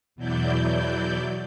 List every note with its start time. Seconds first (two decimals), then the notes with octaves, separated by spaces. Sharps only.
0.16 E2 B2 F#3 E4 D5 G6